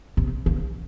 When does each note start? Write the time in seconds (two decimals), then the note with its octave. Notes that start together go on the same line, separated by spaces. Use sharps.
0.17 C3
0.46 C#3